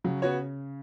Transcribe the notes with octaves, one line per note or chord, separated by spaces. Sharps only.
C#3 F#3
B3 F#4 C#5